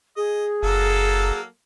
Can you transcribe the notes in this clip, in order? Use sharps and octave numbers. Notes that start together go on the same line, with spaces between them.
G#4 D#5
F#1 F#3 A#3 A4